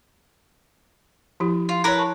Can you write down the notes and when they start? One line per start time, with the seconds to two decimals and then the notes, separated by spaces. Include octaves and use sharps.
1.40 F3 E4 G4
1.69 F4
1.84 E4 A#4 B4 C#5
1.97 A5 C#6